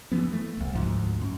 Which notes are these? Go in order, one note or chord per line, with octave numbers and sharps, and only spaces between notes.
E3 F3 G3 B3
A3
D#1 C2
D2 G#2 F3
F#2